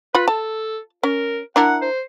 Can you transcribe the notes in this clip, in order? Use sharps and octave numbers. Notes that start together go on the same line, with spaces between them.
F4 B4 B5
A4 A5
C#4 A#4
D4 E4 A#4 F#5
C5